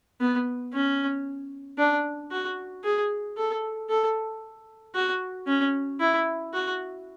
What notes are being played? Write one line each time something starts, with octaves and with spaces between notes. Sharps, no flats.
B3
C#4
D4
F#4
G#4
A4
A4
F#4
C#4
E4
F#4